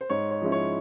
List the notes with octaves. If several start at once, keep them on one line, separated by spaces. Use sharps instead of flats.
C5
G#2 C#5
C#5
F3 G#3 C#4 E4
C#5